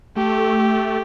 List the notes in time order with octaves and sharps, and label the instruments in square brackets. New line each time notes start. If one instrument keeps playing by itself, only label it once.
[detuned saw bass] A3 [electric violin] G4